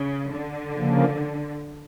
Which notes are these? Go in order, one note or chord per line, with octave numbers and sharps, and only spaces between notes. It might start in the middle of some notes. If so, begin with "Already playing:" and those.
Already playing: C#3
D3
C#3 F3 A#3